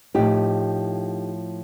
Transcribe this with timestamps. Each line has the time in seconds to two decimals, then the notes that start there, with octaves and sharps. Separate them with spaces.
0.14 A2 F3 D#4 G4